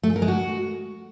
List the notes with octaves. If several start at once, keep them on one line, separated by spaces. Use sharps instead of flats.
A3
G#4
A#4
G#3
F#4